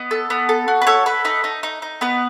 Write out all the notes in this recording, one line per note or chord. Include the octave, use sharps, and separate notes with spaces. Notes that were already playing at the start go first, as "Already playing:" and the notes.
Already playing: B3 D#5
A4
B3
A4
F#4
B4
A4 C#5
A4 B4
D#4 B4
D#4
D#4
D#4
B3 B4